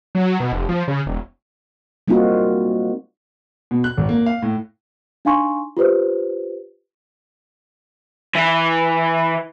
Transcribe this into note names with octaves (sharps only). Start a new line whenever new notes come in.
F#3
B2
F1
F3
C#3
E1
G3 A#3 C4 D#4 F4 F#4
B2
F#6
G#1
A#3
F5
A2
D4 D#4 F5 G#5 C6 C#6
F4 G4 B4 C5
E3